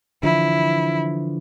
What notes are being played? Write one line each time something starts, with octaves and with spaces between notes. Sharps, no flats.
D3 E3 F3 E4